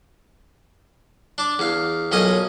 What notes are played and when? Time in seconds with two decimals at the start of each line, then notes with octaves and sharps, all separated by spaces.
1.38 D4 D6
1.59 E2 F5
2.12 B1 A#2 C#4 D#5 D#6